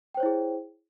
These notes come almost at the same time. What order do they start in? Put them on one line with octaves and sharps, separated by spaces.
G5 C5 C#5 E4 G#4